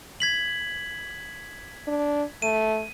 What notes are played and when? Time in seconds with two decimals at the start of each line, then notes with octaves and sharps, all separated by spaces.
0.20 G#6 B6 F#7
1.88 D4
2.42 A3 D#7